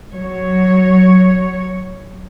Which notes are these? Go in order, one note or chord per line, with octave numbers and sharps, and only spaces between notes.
F#3 C#5